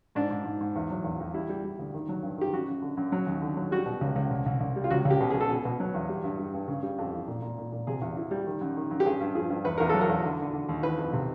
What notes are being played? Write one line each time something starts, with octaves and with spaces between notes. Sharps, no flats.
G#2 D4
G#2
G#2
G#2
E2
F#3
E2
E2
G3 E4
G3
G3
D2
D#3
F#3
G2
D#3 G4
F#2 F#4
F#2
D3
F#2
F#3
D#2
D3
F#3
G3 F#4
B2
C#2
C#2
C2
C2
C2
G3
F4
C#2 F#4
C#2
G4
B2
G#4
B2
A4
B2 G#4
B2
F#3
E2
G3
G2
G3
G2
C#3
G3
F2
E3
A#2
A#2
A#2
A#2
C3 G#4
E2
E3
G3
D#3
F#2
D#3
F#2
G4
G2 G#4
G2
F3 G#4
G2
E2 B4
E2 A#4
F#3 A4
A#4
E2
D3
D3
D3
D#2
E3 B4
F2
C3